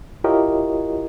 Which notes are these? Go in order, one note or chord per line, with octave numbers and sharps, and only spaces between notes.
E4 F4 G4 A#4 C#5 D#5